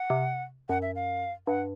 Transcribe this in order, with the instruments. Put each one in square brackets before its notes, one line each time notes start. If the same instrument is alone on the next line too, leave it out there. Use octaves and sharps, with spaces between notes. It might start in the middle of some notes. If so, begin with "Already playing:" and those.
Already playing: [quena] F#5
[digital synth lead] C3
[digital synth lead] F#2 [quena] F#5
[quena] E5
F5
[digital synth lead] G2 [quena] F#5